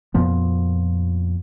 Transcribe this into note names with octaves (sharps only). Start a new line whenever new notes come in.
F2 A#2 F3 B3